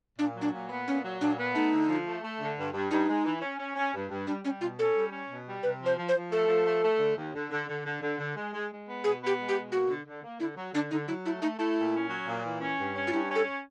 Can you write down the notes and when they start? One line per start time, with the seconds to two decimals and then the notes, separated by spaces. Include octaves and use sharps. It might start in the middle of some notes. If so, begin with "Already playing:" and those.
0.19 A#2 D4
0.36 F#3
0.41 D4
0.53 A#2
0.69 B3
0.87 A#2 C#4
1.04 F#3
1.20 A#2 D4
1.38 B3
1.54 A3 D#4
1.72 D3
1.89 F3
2.06 A3
2.23 A3
2.41 D3
2.58 G2
2.74 G2
2.91 G2 D#4
3.09 G#3
3.25 E3
3.42 C#4
3.59 C#4
3.76 C#4
3.94 G2
4.10 G2
4.27 G3 D4
4.44 G3 C#4
4.61 B2 F4
4.79 C#4 A4
4.96 G3
5.12 C#4
5.30 B2
5.46 G3
5.63 C3 B4
5.81 F3 C5
5.98 F3
6.08 C5
6.15 F3
6.32 A3 A4
6.48 F3
6.65 A3
6.83 A3
6.99 D3
7.17 D#2
7.34 D3
7.51 D3
7.68 D3
7.85 D3
8.02 D3
8.18 D3
8.36 G#3
8.53 G#3
8.70 G#3
8.87 B3
9.03 B2 G#4
9.21 B3
9.26 G4
9.38 G#3
9.48 G4
9.55 B2
9.72 A#3 F#4
9.89 D3
10.06 D3
10.23 A#3
10.40 D3 E4
10.57 F#3
10.73 D3 D4
10.91 D3 D#4
11.07 F#3 E4
11.24 A3 E4
11.42 A3 D#4
11.58 A3 E4
11.77 A#2
11.94 C#4
12.09 F#3
12.27 A#2
12.43 E3
12.61 C#4
12.77 G2
12.96 C#4
13.07 F4
13.12 G2 E4
13.29 C#4
13.35 A4